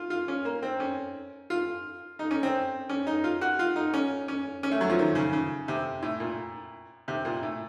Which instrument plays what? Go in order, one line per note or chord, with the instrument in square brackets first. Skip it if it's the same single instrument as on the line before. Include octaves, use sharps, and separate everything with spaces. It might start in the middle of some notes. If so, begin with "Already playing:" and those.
Already playing: [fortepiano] F4
F4
C#4
A#3
C4
C#4
F4
D#4
C#4
C4
C#4
D#4
F4
F#4
F4
D#4
C#4
C#4
C#4
A3
F#3
F3
D#3
C#3
C#3
C3
A2
A#2
C3
A#2
A2